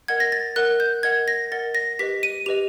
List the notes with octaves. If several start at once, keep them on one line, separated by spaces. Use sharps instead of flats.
A#4 D#5 F#5 G#6
A#6
A6
A#4 D#5 F#5 F#6
G6
A#4 D#5 F#5 G#6
A#6
A#4 D#5 F#5 A6
A#6
G4 B4 D#5 B6
D#7
G4 B4 D#5 F7